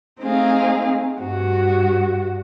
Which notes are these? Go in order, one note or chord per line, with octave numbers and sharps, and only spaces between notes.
A3 C4 D#4 G#4 F5
G2 F#4